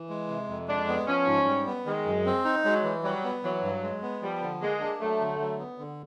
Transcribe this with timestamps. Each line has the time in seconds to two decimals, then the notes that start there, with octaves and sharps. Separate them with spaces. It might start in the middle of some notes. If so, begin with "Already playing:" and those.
Already playing: E3
0.09 G#3
0.29 C3
0.49 F2
0.68 G#3 D4
0.88 B3
1.07 F3 C#4
1.27 G#2
1.47 G3
1.66 B3
1.86 D#3 G#3
2.06 F#2
2.26 C4
2.45 D#4
2.65 F#3 G#3
2.84 E3
3.03 F#3 G3
3.24 B3
3.43 E3 F#3
3.63 G2
3.83 G#3
4.02 B3
4.21 F3 G3
4.41 D3
4.61 G#3 A#3
4.80 D4
5.00 F#3 A3
5.20 D3
5.40 F#3
5.59 B3
5.78 D3